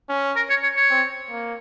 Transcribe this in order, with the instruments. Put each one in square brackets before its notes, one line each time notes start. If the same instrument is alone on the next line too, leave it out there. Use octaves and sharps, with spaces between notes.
[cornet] C#4
[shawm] A#4
C#5
C#5
C#5
[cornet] C4
A#3